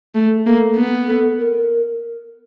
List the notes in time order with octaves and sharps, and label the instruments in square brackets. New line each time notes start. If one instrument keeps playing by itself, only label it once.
[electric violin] A3 [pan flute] A4
[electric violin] A#3 [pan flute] A4
[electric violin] B3
[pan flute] A4
A#4